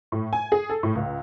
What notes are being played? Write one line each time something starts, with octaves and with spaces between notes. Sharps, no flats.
A2
G#5
G#4
A4
A2
C#2